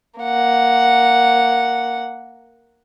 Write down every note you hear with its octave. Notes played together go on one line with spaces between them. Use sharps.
A#3 F#5